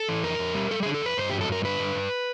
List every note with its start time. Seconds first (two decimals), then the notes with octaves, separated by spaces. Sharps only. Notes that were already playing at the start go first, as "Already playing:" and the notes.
Already playing: A4
0.09 E3
0.24 F2 A#4
0.39 F2
0.55 G3
0.71 G3 A4
0.83 D3 G#4
0.94 A4
1.01 F2 B4
1.17 G2 C5
1.30 F#3 G4
1.41 A4
1.48 G2 A#4
1.64 D3 B4
1.79 G2
1.95 G2